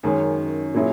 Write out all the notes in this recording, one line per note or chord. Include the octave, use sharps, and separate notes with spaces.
F#2 D#3 G#3 C#4
A#2 F#3 C#4 E4 G#4